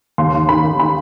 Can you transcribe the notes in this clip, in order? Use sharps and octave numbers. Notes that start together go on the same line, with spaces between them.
D#2 C6
D#2
D#3 B5
D#3
B5